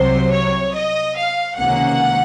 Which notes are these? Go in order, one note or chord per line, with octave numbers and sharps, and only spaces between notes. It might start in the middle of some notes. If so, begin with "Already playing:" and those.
Already playing: C2 C3 F#3 C5
C#5
D#5
F5
C#2 C3 D#3 A#3 C#4 F#5